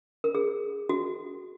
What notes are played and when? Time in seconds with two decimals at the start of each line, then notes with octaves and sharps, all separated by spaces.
0.24 A#4
0.35 G#4
0.89 F#4